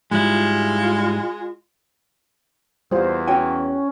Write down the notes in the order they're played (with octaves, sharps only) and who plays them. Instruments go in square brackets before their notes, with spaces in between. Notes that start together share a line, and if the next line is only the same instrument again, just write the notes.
[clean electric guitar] G#2 G3 E4 [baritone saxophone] G#3 [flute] F4
[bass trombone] E2 [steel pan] G3 F4 [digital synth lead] C5
[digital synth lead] C#4 [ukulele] F#4 G5 G#5